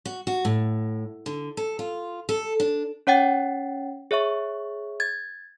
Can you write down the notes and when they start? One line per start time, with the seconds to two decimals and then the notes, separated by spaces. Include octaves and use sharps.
0.06 F#4
0.27 F#4
0.45 A2
1.26 D3
1.57 A4
1.79 F4
2.29 A4
2.60 D4
3.07 C#4 C#5 F#5 G5 A6
4.11 G#4 C#5 E5 C#6
5.00 G#6 A6